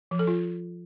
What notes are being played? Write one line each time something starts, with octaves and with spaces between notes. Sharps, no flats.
F3
A4
F4